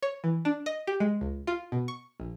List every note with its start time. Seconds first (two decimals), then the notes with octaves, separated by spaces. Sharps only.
0.03 C#5
0.24 E3
0.45 D4
0.66 D#5
0.87 G4
1.00 G#3
1.21 C#2
1.47 F4
1.72 B2
1.88 C#6
2.20 A#1